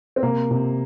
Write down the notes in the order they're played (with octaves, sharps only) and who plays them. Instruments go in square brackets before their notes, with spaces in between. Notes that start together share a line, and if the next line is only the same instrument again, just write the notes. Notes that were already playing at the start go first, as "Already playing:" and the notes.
[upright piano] C4
[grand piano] C3 [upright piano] A#3
[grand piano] C3